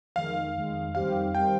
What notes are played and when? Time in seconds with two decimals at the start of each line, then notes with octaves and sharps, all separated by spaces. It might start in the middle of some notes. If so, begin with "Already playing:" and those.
0.16 F2 D#3 G#3 F5
0.55 F2 D#3 G#3
0.95 F2 D#3 G3 C4 G4 F5
1.35 D#3 G3 C4 G4 G5